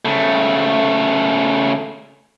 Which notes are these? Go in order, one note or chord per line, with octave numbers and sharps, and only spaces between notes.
C#3 A3